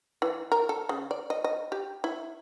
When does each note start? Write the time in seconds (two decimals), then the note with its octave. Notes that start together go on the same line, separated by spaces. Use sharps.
0.22 E3
0.52 A#4
0.69 A4
0.89 C#3
1.11 D5
1.30 D#5
1.44 D#5
1.72 G4
2.04 E4